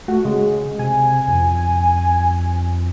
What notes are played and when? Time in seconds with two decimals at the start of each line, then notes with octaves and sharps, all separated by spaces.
0.08 A3 F#4
0.25 C#3 G#3
0.79 C3 G#5
1.28 F2